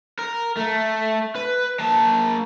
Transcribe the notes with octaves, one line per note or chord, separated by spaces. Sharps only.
A#4
A3
B4
A#3 A5